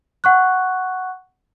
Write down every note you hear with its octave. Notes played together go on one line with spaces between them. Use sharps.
F#5 C#6 F#6